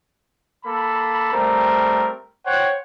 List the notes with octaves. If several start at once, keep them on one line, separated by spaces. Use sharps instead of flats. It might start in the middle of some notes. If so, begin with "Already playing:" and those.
A#3 A4 B5
G3 A3 C4 A#4
C5 C#5 F#5 G5